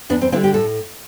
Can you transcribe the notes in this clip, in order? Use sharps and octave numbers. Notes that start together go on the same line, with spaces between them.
E2 B3 D4
C4
D3 G3 C4 E4
G4
A2 A4